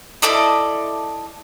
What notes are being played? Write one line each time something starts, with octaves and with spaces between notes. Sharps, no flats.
E4 A4 D5 D#5